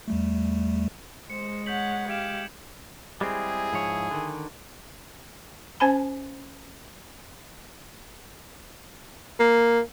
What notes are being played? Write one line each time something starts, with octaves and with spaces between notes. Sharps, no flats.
E2 G3 A3
G#3 C5 C#7
C#5 F#5 G6 B6 F#7
G4 F5 G#6 D7 E7
G3 G#3 C4 E4 G#4
G#2 F3 C#5
D3 D#3
C#4 C5 G#5 A5 B5
A#3